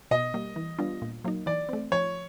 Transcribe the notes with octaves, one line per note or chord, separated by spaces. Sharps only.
B2 D#5
G3 A#3
E3
G3 B3 D4 F4
A#2
F#3 A#3 D#4
E3 D5
A3 C4
F3 C#5